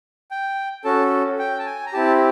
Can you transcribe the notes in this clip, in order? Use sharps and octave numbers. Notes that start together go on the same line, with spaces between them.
G5
C#4 F#4 A4 A5
G5
A5
G#5
A#5
C4 E4 G4 A5